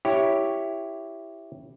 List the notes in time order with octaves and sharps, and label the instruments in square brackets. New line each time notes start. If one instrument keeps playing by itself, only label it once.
[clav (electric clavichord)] E4 G4 C#5